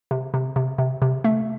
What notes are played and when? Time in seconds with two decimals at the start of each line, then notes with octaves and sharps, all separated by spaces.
0.11 C3
0.34 C3
0.56 C3
0.78 C3
1.02 C3
1.24 A3